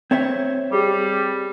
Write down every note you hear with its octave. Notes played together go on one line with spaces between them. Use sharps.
C4 C#5 E5
G3 G4 G#4 D6